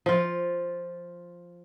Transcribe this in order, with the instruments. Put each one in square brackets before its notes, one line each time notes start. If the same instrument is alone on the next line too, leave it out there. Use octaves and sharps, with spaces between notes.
[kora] F3 F4